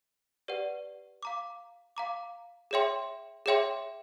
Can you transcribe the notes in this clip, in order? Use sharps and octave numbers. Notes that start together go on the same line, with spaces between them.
G4 B4 D5 F#5
F5 A#5 D6
F5 A#5 D6
G#4 C#5 E5 G5 C6
G#4 C#5 E5 G5 C6